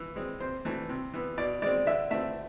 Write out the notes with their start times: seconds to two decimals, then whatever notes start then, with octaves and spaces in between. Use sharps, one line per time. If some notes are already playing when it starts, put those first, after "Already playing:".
Already playing: E3
0.16 G#3 C4
0.40 C3 C5
0.65 E3 A3 C4
0.89 C3
1.13 E3 B3
1.38 B2 D5
1.62 G#3 C4 D5
1.86 D3 E5
2.11 A3 C4 E5